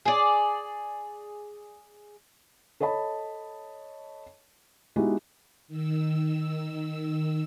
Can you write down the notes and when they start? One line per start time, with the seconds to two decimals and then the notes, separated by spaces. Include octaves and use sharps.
0.05 G#4 D5
2.80 A4 C#5 D#5 A5 B5
4.96 G#3 B3 D#4 E4 F#4 G4
5.68 D#3 E6